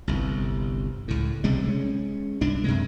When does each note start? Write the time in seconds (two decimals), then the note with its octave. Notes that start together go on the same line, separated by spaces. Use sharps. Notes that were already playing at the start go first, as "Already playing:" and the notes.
0.08 G1 C2
1.08 C#2 A2
1.44 B1 C3 G3 G#3
1.64 G#3 C#4
2.41 C2 G2 D4
2.64 F#2 C3 G#3